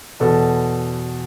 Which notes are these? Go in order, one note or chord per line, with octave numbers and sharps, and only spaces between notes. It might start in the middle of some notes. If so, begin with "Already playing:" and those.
E2 B2 A4